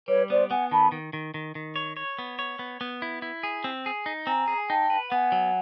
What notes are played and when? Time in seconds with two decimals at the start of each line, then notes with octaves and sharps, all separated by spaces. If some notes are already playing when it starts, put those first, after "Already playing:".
0.08 G3 B4 C#5
0.30 B3 C5 D5
0.50 B3 F#5 G#5
0.71 D#3 A5 B5
0.92 D#3
1.13 D#3
1.34 D#3
1.55 D#3
1.76 C#5
1.97 C#5
2.19 B3
2.39 C#5
2.59 B3
2.81 B3
3.02 E4
3.22 E4
3.43 G#4
3.64 C4
3.86 G#4
4.06 D#4
4.27 C4 G#5 A#5
4.48 G#4
4.69 D#4 G5 A5
4.90 B4
5.10 B3 F#5 G#5
5.32 F#3